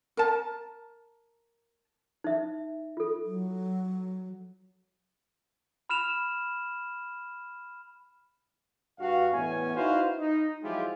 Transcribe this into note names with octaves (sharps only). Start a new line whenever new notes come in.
A#4 A5
D#4 E5
F4 A4
F#3
B5 F6 E7 F7
G2 F#4 F5
E2 A2 B3 C#4 G#5
D#4 E4 F#4 B4 C5 F5
D#4
F3 F#3 G#3 E4 F4 G4